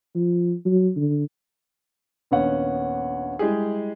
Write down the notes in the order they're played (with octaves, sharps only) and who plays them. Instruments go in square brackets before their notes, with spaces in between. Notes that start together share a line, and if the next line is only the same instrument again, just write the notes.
[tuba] F3
F#3
D3
[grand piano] A#1 D#2 B3 C#4 F#5
G3 G#3 E4 G4 G#4